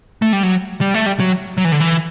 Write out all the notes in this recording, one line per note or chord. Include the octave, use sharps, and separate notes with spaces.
A3
G3
F#3
G3
A3
G3
F#3
F#3
E3
D3
E3